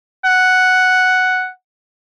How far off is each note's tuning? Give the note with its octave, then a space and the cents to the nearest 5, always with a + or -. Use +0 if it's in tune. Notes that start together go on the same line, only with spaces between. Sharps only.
F#5 +0